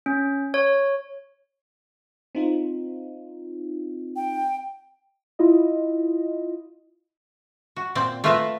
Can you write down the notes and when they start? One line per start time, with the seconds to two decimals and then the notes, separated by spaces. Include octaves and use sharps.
0.06 C#4
0.54 C#5
2.35 C4 D#4 F4
4.16 G5
5.39 E4 F4 D#5
7.76 F#4
7.95 A#2 C4 D5
8.24 A3 F4 A#4 B4 E5